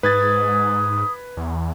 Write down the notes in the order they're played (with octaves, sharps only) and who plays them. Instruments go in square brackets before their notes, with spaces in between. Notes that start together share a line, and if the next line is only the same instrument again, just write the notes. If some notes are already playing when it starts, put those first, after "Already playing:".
[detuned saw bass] G#2 [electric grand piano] B4 G#6 A6 [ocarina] D#6
[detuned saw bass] E2